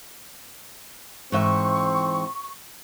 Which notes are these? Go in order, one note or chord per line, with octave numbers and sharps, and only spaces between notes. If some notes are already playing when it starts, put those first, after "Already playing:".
G#2 E3 C4 E5 C#6